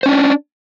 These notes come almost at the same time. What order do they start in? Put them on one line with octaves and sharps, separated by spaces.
C5 C#4 D4